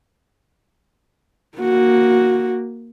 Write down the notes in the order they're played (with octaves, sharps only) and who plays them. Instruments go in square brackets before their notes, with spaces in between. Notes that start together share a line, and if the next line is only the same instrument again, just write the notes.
[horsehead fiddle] A#3 F#4